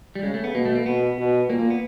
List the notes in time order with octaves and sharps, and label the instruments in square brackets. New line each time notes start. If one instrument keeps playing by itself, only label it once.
[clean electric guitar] G3
[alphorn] C#3 [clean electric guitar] G#3
[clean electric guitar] A3
B3
[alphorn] B2 [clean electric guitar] A#3
[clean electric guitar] A3
A#3
[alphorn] B2 [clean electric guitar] B3
[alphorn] B2
[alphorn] A#2 [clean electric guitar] A#3
[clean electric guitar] A#3
B3